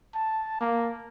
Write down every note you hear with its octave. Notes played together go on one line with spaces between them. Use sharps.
A5
A#3